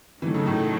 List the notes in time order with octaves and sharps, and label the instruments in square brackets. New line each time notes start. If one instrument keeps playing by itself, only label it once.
[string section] D#3 F#3 A3 [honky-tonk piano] E3
[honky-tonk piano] C#3
A2